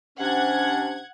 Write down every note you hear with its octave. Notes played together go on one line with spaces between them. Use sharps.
C3 C#4 D4 F#5 G#6